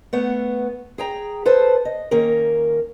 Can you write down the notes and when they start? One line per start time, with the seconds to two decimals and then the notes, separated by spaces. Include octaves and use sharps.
0.13 A3 B3 F#5
0.98 G#4 G5 A#5
1.45 A4 B4 C5 A5
1.85 D#5
2.11 D#3 A#3 C#4 A#4